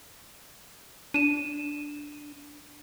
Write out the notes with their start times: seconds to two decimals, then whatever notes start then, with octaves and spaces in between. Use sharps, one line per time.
1.14 D4 D#7 E7